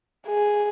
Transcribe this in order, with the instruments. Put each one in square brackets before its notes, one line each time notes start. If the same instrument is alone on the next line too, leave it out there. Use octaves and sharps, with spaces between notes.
[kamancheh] G#4